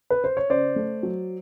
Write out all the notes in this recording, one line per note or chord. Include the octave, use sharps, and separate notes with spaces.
B4
C5
C#5
C#3 C5 D5
A3
F#3